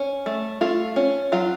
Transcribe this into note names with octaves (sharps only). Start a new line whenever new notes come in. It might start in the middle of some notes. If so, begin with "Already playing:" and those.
Already playing: C#4
A3
A3 F4
C#4
F#3 F4